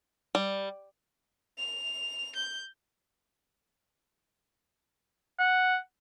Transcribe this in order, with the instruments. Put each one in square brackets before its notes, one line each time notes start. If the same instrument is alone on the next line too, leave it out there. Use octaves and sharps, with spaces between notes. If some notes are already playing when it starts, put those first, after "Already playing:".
[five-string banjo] G3
[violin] F7
G6
[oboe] F#5